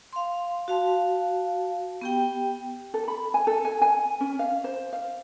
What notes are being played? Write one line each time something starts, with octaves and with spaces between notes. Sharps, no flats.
F5 C6
F#4 F5 A5
B3 G4 G5
A4
B5
G#5
A4
G#5
G#5
C#4
F5
C5
F5